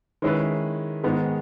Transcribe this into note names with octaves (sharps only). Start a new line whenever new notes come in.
D#3 G#3 C#4 E4 B4
G#2 D#3 G#3 B3